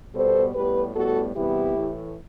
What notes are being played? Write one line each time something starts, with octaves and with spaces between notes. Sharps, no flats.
B2 G3 B3 A4 C5
A2 G3 B3 G4 B4
A2 G3 B3 F#4 A4
E2 C3 G3 B3 E4 G4
A2 E3 A3